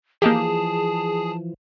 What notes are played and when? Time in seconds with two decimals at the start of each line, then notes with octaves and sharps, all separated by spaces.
0.22 E3 F3 A#3 D#4 G4 G#4 A5